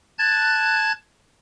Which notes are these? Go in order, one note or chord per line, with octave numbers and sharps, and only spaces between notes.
A5 F#6 G#6 A6